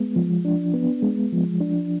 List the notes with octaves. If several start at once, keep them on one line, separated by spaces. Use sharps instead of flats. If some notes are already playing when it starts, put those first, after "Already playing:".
Already playing: G#3 B3
F3
D4
B3
G#3
F3
D4